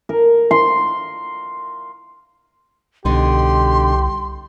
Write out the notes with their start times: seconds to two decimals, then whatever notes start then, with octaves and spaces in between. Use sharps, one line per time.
0.09 A#4
0.51 C6
3.05 C2 B2 D3 D#4 G4 C6